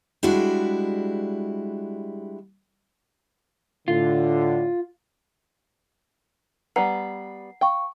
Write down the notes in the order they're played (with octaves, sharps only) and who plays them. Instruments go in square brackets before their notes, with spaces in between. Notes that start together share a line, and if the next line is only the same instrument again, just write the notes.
[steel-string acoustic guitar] G3 G#3 D4 E4 F#4
[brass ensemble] A2 D3 [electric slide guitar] F4
[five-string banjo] G3 B3 B4 [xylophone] F#5 A#5 [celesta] C7
[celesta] F5 C#6 [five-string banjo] G5